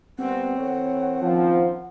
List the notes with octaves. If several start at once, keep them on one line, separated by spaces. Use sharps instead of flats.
A#2 G3 B3 C4 F#5
E3 A4 C#5
D#3 F3 C#4 F4